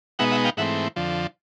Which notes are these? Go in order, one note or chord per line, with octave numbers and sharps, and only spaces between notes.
B2 G#3 B3 D#4 E5 F#5
E5 F#5
F5 G5
G#2 E3 A3 C4 E5 F#5
F2 D3 F3